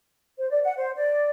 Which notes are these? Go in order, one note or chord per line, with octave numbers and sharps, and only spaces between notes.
C5
D5
F#5
C5
D5